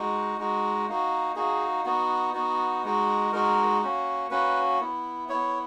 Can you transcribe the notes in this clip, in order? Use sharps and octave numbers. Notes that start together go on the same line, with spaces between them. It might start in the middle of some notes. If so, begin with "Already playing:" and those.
Already playing: G#3 D#4 F#4
G#3 D#4 F#4
A#3 D#4 F#4
A#3 D#4 F#4 G#4
B3 D#4 F#4
B3 D#4 F#4
G#3 D#4 F#4
G#3 D#4 F#4 A#4
A#3 C#4 F#4
A#3 C#4 F#4 B4
B3 E4
B3 E4 C#5